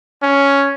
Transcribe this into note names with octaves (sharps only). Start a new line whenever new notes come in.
C#4